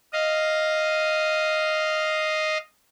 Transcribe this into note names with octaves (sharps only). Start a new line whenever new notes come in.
D#5 F5